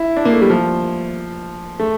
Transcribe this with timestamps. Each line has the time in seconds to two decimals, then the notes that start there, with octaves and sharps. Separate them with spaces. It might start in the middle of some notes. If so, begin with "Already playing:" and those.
Already playing: E4
0.17 D4
0.25 A#3
0.33 A3
0.41 G3
0.50 F3
1.79 A3